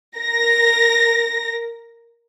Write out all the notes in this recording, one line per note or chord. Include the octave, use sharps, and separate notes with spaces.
A#4 A#6